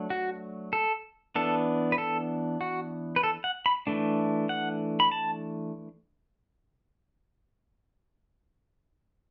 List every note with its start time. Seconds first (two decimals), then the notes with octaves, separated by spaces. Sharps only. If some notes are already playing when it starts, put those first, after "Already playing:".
Already playing: F#3 A3 D4
0.10 F#4
0.73 A4
1.36 E3 B3 D4 A4
1.92 B4
1.98 A4
2.61 F#4
3.16 B4
3.23 A4
3.44 F#5
3.66 B5
3.87 E3 A3 D4
4.49 F#5
5.00 B5
5.12 A5